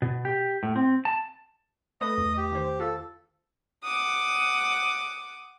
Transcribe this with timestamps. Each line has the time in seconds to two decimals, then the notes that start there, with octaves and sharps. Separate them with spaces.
0.02 B2
0.25 G4
0.63 A2
0.76 C4
1.05 A5
2.01 A3 B4 D#5 D#6
2.18 E2
2.37 G4
2.52 D#3 C5
2.80 F4 A4
3.84 F#5 D6 D#6